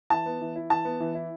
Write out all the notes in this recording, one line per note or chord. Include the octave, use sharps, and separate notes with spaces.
E3 A5
B3
E3
E4
E3 A5
B3
E3
E4